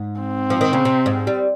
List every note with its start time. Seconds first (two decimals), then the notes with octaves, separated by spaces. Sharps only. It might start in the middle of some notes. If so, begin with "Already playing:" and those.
Already playing: G#2
0.20 C4
0.50 F3
0.61 D#3
0.73 C#3
0.85 C3
1.06 G#2
1.27 G3